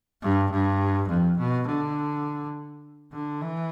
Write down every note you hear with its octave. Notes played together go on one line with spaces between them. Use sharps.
G2
G2
F2
B2
D3
D3
E3